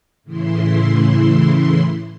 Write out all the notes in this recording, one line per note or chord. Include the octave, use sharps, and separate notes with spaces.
A2 C#3 E3 E4 C6